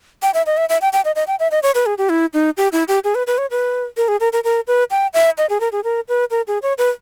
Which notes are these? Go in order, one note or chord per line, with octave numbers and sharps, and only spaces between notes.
G5
E5
D#5
E5
E5
G5
G5
D#5
D#5
G5
E5
D#5
C#5
B4
G#4
G4
E4
D#4
G4
E4
G4
G#4
B4
B4
C#5
B4
A#4
G#4
A#4
A#4
A#4
B4
G5
E5
D#5
G#4
A#4
G#4
A#4
B4
A#4
G#4
C#5
B4